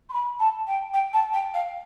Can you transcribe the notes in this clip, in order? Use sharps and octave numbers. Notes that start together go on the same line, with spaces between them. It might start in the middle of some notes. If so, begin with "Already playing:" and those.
C6
B5
A5
G5
G5
A5
G5
F5